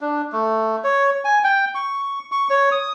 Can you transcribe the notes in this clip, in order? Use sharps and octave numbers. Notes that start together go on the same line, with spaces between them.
D4
A3
C#5
G#5
G5
C#6
C#6
C#5
D#6